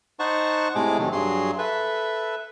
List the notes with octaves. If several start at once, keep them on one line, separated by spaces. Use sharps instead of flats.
D#4 C5 F#5 A5 C#6
A2 C3 G#3 A3 G#4 D6
C3 D#3 F#3 A3
G2 F#3 G#4 C6
A4 B4 E5